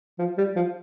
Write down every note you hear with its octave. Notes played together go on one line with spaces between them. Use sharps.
F3
G3
F3